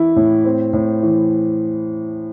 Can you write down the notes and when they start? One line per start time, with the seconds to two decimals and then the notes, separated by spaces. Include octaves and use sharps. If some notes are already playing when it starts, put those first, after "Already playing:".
Already playing: E3 E4
0.16 A2
0.45 C4
0.73 A2
1.03 E3